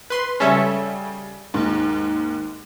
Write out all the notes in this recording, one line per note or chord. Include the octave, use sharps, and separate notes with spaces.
B4 C6
C#3 G3 C#4 A4 E5
D#2 G#2